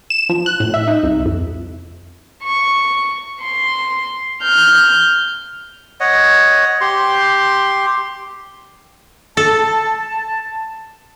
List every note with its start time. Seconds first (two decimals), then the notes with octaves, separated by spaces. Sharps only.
0.10 E7
0.29 F3
0.46 F#6
0.60 A2
0.74 E5
0.88 D#4
1.03 C2
1.26 F2
2.44 C#6
3.42 C6
4.42 F6 G6
6.00 C#5 D#5 F#5
6.81 G4 C6
9.37 A4 A5